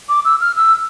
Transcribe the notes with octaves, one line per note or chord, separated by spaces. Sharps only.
D6
E6
F6
E6